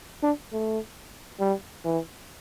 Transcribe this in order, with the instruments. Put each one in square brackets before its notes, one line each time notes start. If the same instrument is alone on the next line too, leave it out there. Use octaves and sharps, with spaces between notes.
[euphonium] D4
A3
G3
E3